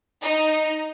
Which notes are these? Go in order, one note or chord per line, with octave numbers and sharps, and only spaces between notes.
D#4